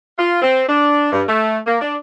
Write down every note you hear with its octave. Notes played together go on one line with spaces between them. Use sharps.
F4
C4
D4
G2
A3
A#3
D4